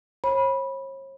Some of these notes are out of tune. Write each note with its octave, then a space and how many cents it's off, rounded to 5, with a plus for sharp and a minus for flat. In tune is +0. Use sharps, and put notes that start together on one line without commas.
C#5 -45 B5 -15